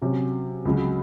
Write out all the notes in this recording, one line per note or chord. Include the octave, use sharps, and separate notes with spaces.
C3 F#3 C#4
C#2 C#3 F#3